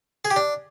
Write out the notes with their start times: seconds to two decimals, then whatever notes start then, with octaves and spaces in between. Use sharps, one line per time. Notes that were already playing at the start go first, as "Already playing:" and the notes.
0.25 G#4
0.31 G4
0.36 D4